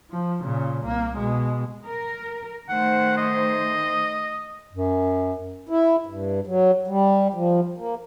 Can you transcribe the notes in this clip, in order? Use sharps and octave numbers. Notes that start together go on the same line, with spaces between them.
F3
A#2 C#3
C2 A#3
B2 G#3
A#4
D#3 A3 C5 F#5
D#5
F#2
E4
G2
F#3
G3
F3
A#3